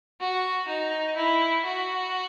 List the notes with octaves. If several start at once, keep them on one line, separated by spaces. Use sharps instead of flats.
F#4
D#4
E4
F#4